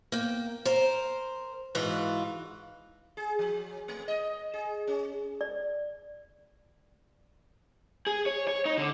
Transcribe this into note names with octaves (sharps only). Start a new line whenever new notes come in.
A#3 G5
A#4 C5
G#2 E3 F4 F#4
G#4
F3
A3
D#5
G#4
C#4
D5
G#4
C#5
C#5
D#4
D3